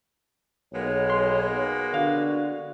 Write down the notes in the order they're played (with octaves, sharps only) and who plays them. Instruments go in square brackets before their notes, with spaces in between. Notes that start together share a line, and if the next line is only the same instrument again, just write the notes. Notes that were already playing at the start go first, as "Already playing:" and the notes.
[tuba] B1 [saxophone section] G#3 A#3 B3 [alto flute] C#5
[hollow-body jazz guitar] C6
[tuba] D3 [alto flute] F#4 [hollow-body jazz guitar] F5